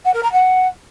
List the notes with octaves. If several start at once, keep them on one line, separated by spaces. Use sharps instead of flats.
F#5
A#4
A#5
F#5